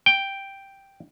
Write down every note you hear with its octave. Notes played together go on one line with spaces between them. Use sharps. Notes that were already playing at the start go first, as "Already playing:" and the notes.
G5